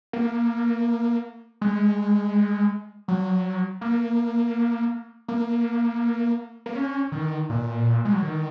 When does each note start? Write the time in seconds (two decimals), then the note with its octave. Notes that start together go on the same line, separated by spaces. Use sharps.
0.13 A#3
1.61 G#3
3.08 F#3
3.81 A#3
5.28 A#3
6.66 A#3
6.75 C#4
7.12 D#3
7.49 A#2
8.05 G#3
8.13 F#3
8.22 D#3